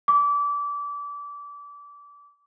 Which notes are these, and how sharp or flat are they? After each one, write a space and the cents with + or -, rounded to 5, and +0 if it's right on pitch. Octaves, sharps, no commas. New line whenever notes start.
D6 -25